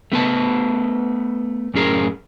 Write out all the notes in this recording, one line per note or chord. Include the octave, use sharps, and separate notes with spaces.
A3 B3 B4 A5
F#2 A2 C#4 G#4 A#4